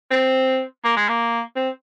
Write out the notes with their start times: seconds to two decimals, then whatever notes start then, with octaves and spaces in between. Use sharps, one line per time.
0.11 C4
0.84 A#3
0.97 G#3
1.09 A#3
1.56 C4